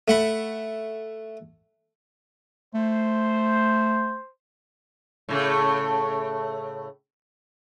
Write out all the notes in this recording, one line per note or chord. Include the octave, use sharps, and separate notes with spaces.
A3 F#5 B5
A3 C5
A2 C#3 A3